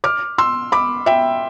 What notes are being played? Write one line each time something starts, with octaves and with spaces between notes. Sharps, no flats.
D6 F6
C6 E6
B5 D6
E5 G5